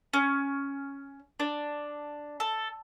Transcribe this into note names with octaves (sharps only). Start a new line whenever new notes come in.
C#4
D4
A4